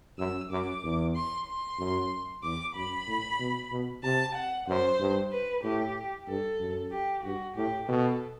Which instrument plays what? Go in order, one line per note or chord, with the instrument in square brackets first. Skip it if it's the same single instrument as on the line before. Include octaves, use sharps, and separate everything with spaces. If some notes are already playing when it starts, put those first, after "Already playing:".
[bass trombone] F#2 [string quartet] E6
[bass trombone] F#2 [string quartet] D6
[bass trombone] E2
[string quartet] C6
C6
[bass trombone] F#2
[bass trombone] E2 [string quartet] D6
[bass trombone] F#2 [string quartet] B5
[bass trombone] A2
B2
B2
[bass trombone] C3 [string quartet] A5
[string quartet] F#5
[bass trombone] F#2 [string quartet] C5
[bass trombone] G2
[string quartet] B4
[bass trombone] A2 [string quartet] G4
[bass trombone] G2 [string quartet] A4
[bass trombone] F#2
[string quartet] G4
[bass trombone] G2 [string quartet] F#4
[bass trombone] A2 [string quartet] G4
[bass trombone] B2 [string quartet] A4